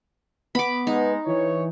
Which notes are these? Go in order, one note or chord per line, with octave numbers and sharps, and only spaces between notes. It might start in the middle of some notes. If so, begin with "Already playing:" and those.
B3 B5 D6
G#3 D#4
E3 C#5